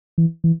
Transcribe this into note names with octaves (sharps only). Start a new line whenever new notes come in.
E3
E3